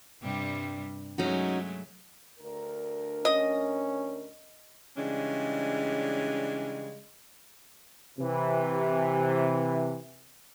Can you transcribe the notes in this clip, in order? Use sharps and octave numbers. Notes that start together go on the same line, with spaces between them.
G2 C3 G3
F#3 G#3 A3 C#4 D#4 F#4
D2 D4 A#4
C#4 D#5
C#3 E3 G3 G#3 C#4 D4
C3 E3